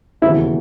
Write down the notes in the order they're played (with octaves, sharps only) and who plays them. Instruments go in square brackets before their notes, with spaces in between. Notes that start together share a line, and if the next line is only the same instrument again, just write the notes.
[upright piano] E1 D#2 C#3 [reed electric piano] E4